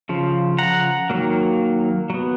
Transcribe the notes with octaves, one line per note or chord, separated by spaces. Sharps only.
C#3 F3
F#5 A#5
D#3 F#3 A#3
F#3 B3